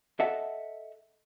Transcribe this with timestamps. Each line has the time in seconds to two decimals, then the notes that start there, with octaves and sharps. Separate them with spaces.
0.20 A4 D#5 E5 F#5 A5